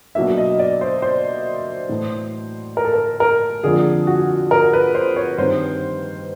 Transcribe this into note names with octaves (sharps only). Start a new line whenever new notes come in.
B2 F#3 A#3 D4 E5
D#5
D5
C5
C5
A2 E3 A3
A#4
A4
A#4
A#4
F2 D3 F3 A#3 D4 G#4
F#4
A#4
B4
C5
C#5
G2 D#3 G3 C4 D#4 C5